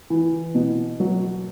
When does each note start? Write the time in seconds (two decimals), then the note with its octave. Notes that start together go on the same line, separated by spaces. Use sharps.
0.10 E3
0.55 B2
1.00 F#3